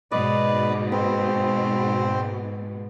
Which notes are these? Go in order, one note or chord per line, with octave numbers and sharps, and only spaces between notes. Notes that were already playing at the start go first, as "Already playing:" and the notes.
G#2 B2 B4 D5 D#5
C4 B4